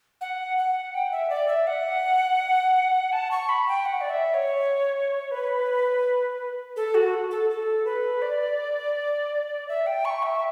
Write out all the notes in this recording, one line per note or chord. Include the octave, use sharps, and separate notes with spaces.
F#5
F#5
G5
E5
D5
E5
F#5
A5
C#6
B5
G5
F#5
D5
E5
C#5
B4
A4
F#4
A4
A4
B4
D5
E5
G5
C#6
E5